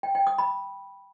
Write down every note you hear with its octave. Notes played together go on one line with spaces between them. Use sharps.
G5
G5
D#6
B5